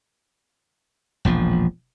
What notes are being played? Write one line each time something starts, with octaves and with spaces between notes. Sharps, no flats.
E1 A#1 F3